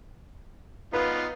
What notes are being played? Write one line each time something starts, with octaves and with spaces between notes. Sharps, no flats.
B3 D#4 F4 B4